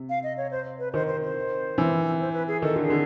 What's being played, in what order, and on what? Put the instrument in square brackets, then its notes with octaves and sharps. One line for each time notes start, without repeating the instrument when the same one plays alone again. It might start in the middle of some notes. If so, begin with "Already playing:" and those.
Already playing: [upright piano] C3
[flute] F5
D#5
C#5
C5
B4
[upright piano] D#3 [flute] C5
[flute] C5
C5
[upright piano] E3
[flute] C5
B4
G#4
[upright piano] D#3 [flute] A4
[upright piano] D3
[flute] G#4
[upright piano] D3